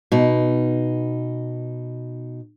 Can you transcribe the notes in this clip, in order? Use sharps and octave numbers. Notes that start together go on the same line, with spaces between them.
B2 D#4